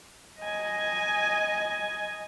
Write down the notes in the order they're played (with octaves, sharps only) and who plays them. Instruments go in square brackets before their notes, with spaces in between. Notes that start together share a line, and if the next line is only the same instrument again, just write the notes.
[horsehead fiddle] D#5 G#5